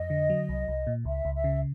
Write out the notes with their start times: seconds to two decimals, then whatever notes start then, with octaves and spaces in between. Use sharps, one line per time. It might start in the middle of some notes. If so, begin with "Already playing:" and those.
Already playing: F2 D#5
0.10 D3
0.30 F#3
0.49 C2
0.68 C2
0.87 A#2
1.05 C#2 E5
1.25 C#2
1.34 E5
1.44 C#3